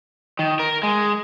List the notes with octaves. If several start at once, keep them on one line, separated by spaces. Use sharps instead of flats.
D#3
A#4
G#3